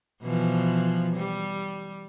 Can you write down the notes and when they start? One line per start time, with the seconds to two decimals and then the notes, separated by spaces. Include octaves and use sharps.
0.22 B2 E3 F3
1.16 G3